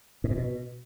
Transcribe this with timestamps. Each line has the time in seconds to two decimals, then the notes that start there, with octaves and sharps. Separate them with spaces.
0.24 G#2
0.31 A#2
0.37 B2